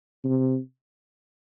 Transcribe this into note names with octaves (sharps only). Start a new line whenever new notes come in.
C3